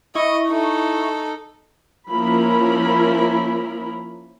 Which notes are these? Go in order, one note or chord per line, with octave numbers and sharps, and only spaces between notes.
E4 D#5 C#6
D#4 A4
F3 A#3 C#4 E4 A#4 B5